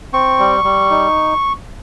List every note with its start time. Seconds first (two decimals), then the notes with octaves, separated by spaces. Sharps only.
0.13 C4 C#6
0.39 G3
0.64 G3
0.91 D#4